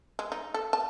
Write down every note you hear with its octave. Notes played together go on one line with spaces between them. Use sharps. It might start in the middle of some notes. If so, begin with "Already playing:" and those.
G#3
D#4
A4
A5